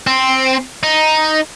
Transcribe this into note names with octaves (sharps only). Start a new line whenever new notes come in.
C4
D#4